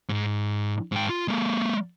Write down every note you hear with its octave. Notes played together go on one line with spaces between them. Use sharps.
G#2
G#2 G5
F4
G#3 A#3